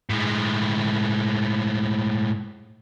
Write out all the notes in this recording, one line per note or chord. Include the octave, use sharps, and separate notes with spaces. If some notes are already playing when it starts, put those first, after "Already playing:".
A2 G#3